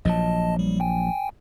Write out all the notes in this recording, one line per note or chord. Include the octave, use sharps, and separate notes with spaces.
A#1 F3 F#3 D#5 A5
G3
G5 G#5